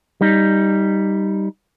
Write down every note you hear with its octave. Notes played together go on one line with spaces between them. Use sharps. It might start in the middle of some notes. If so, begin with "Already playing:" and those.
G3 D#4